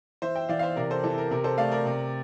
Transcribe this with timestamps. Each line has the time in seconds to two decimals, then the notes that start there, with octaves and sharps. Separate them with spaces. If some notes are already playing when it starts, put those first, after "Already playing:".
0.22 E3 C5 E5
0.36 E5 G5
0.49 E3 D5 F5
0.59 F5
0.62 C5 E5
0.76 C3 A#4 D5
0.90 A4 C5
1.03 E3 A4
1.18 A#4
1.31 C3 A#4
1.44 A4 C5
1.58 A3 D5 F5
1.72 A#4 D5
1.85 C3